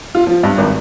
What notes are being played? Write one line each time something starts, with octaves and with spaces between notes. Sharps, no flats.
F4
F3
G2
G#1